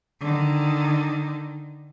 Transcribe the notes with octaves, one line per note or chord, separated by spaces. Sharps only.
D3 D#3